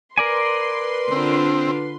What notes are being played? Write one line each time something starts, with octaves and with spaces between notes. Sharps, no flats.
A#4 B4 D5 G#5 C6
D3 C4 D4 F4